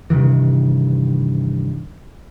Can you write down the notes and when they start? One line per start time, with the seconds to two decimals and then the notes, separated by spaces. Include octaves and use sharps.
0.10 G2 C3 D#3 E3